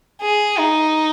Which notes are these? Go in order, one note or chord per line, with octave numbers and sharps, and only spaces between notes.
G#4
D#4